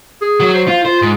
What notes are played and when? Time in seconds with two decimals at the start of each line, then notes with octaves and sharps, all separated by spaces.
0.21 G#4
0.40 F#3
0.53 C5
0.67 F4
0.85 F4 C5
1.02 G#2